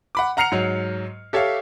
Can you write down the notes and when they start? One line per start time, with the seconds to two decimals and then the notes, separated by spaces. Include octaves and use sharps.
0.15 F#5 B5 D6
0.37 F#5 A#5 F6 C7 C#7 F7
0.52 G#2 F#3
1.33 G4 A4 C#5 E5 F5